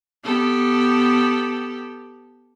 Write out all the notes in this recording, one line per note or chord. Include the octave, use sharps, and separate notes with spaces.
B3 G4 A4